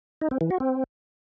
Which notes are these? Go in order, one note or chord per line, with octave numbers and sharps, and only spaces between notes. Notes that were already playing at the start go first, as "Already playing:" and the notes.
D#4
C4
E3
F#4
C4